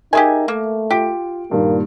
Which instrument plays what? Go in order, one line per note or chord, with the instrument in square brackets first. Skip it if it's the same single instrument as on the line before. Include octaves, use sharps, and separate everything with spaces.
[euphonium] D#4 [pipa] G4 G#4 G#5 [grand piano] A#4 E5
[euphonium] A3 [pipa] A#3
[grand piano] F4 D7 [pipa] G4
[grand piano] G2 A#2 D#3 [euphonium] A#3